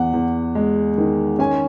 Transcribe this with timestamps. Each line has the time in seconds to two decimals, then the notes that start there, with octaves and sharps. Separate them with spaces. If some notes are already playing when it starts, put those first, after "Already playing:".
Already playing: E2 F#5
0.13 E2
0.55 G#3
0.98 D#3
1.39 C#4 G#5